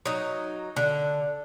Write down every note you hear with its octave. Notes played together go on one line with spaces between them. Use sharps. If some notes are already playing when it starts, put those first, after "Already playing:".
F#3 D#4
D3